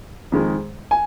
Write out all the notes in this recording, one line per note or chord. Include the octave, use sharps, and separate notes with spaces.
F2 D#3 G#3
G#5